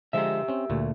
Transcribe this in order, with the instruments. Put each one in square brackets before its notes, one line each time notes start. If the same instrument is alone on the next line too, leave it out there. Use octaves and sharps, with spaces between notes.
[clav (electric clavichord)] D3 F3 G#3 [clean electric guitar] G4 E5
[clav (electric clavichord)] C4 C#4
D2 A#2 A3